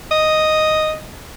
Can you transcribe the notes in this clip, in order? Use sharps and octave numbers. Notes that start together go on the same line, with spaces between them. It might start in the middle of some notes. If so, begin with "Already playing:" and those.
D#5